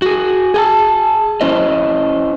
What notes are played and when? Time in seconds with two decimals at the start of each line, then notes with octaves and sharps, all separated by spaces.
0.02 F#4 G#4
0.54 G#4 G5 A5
1.41 C#4 E4 C5 D#5